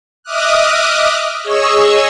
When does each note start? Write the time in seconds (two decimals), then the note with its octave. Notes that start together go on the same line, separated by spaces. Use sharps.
0.23 D#5 E5 D6 D#6 F6 F#6
1.43 G#4 C#5 D#5 C#6 E6